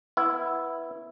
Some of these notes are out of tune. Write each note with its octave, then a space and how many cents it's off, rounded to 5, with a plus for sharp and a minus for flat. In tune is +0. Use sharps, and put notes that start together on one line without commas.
B3 +0 E4 +0